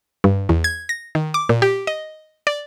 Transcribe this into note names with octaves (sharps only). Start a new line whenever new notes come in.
G2
E2
G#6
A#6
D#3
D6
A#2
G4
D#5
D5